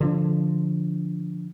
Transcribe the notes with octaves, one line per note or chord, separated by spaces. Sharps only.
D3 F3 D4